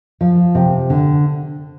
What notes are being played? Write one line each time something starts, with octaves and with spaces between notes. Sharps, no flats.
F3
C3
D3